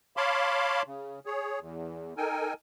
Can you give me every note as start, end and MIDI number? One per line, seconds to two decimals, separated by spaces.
0.17 0.82 73
0.17 0.82 77
0.17 0.82 81
0.17 0.82 83
0.17 0.82 84
0.17 0.82 86
0.86 1.19 49
1.26 1.59 68
1.26 1.59 73
1.60 2.14 40
2.17 2.53 63
2.17 2.53 69
2.17 2.53 70
2.17 2.53 79
2.17 2.53 80